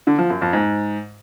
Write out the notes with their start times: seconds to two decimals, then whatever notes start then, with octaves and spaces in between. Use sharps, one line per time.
0.07 D3
0.18 F3
0.30 F#2
0.41 F2
0.53 G#2